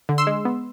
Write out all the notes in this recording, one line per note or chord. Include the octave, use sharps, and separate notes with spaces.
D3
C6 E6
G#3
B3